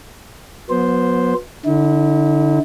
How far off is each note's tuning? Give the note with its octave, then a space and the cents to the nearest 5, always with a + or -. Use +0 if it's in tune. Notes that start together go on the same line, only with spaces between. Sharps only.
F#3 -35 B3 -20 C5 +0
D3 +0 E4 -45